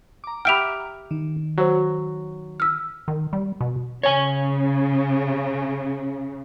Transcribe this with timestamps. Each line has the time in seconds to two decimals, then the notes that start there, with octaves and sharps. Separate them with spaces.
0.24 A#5 D6
0.45 G4 E5 F#5 G5 B5 F6 D7 F7
1.11 D#3
1.58 F#3 F#4 C5
2.60 E6 F6
3.08 D#3
3.33 G3
3.61 B2
4.03 C#3 C#5 G#5